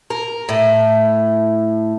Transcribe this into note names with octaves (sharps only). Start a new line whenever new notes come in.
A#4
A2